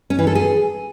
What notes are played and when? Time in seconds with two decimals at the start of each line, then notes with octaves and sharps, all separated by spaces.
0.10 C#4
0.19 E3
0.27 A4
0.35 G#4